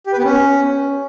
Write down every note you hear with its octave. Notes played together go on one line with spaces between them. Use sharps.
G4
B4
B3
C#4